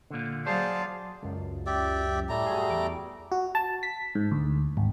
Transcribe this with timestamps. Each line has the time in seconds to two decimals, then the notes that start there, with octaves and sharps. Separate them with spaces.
0.10 A#2 D3
0.47 F#3 G#4 C5 D5 F5 A5
1.22 C#2 F#2
1.66 G4 D5 E5
2.29 A2 G3 A3 A#5
2.46 F#4 G#4
2.70 E2 D6
3.32 F#4
3.55 A5
3.83 B6
4.15 G#2
4.32 D2
4.77 G#1